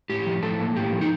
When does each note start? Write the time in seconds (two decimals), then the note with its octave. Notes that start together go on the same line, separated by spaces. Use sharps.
0.10 A2 G4
0.26 F3
0.43 A2 A4
0.59 A#3
0.76 A2 G4
0.93 F3
1.01 D#4